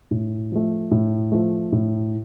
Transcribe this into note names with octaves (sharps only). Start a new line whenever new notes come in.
A2
F3 A3
A2
F3 A3
A2